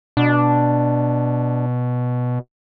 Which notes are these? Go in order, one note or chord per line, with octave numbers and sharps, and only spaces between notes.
B2 D4